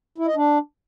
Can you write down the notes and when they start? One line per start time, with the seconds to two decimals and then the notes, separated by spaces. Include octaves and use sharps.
0.18 E4
0.27 D#5
0.36 D4